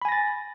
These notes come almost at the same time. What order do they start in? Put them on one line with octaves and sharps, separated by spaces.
B5 G#5 A#6 A6